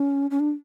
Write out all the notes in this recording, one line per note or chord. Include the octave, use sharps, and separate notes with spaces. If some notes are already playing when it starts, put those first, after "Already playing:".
Already playing: C#4
C#4
D4